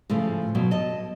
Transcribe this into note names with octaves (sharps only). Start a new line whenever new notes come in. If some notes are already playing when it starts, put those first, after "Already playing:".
A2 C#3 F3 A3
B2 F#3
D#5 A5